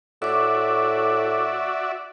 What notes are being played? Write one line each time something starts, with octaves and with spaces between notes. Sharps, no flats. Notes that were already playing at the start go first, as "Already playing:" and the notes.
A2 F#4 D5 E5 C#6 D6